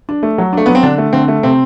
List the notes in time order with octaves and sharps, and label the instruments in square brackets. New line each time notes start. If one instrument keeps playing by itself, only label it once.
[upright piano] D4
A3
F#3
[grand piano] A3 [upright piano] D4
[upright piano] F#3 [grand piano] B3
[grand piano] C4
[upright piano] D3 [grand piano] D4
[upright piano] A3
[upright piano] D3 [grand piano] C4
[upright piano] A3
[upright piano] C3 [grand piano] C4